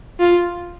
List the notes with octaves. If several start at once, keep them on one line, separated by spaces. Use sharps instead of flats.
F4